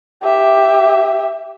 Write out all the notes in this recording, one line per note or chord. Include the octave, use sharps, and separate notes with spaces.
G4 E5